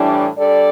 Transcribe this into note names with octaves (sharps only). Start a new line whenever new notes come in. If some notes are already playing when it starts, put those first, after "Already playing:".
Already playing: A2 E3 G3 D4
G3 D4 A4 D5